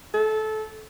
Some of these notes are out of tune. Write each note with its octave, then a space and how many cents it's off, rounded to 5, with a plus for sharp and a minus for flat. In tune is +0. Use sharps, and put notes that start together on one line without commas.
A4 -20